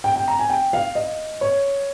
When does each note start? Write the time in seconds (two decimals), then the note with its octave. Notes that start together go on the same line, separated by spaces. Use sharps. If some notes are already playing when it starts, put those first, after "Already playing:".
0.04 G5
0.16 G5
0.28 A#5
0.39 G#5
0.50 G5
0.73 F5
0.95 D#5
1.41 C#5